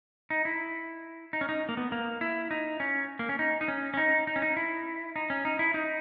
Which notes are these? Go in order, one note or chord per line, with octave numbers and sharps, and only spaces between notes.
D#4
E4
D#4
C#4
D#4
A#3
B3
A#3
E4
D#4
C#4
A#3
C#4
D#4
D#4
C#4
C#4
D#4
D#4
C#4
D#4
E4
D#4
C#4
D#4
E4
D#4